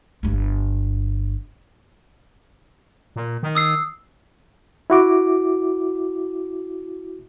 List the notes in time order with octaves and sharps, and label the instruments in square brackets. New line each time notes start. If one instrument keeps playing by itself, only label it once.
[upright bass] G1 G2
[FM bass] A#2
D#3
[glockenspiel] D#6 E6 C7
[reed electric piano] E4 F#4 D6